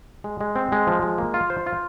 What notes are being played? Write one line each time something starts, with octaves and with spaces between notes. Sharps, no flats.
G#3
G#3
C4
G#3
F3
G#3
A#3
F4
C5
F4